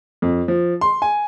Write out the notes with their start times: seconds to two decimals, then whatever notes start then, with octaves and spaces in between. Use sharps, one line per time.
0.22 F2
0.48 F3
0.81 C6
1.02 G#5